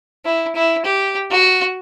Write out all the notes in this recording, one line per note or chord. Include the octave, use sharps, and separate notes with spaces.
E4
E4
G4
F#4